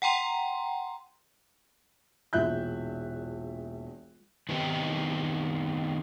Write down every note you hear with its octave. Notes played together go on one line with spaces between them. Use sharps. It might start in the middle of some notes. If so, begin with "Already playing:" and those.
F#5 G5 A#5 C6
E1 A#1 E5 F#6 G6
D#3 B3 C4 D#4 G4